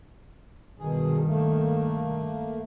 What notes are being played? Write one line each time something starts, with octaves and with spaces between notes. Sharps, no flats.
G2 B2 D#3 G#4
A3 A#3